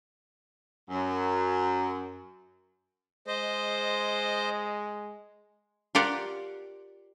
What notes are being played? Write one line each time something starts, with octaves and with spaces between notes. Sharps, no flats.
F#2
G#3 C5 D#5
F4 G4 A#4 D5 F#5